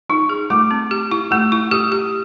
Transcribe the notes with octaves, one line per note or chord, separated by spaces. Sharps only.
D#4 C#6
G#4
A3 D6
C4
G4
E4
A3 E6
E4
G4 D#6
G4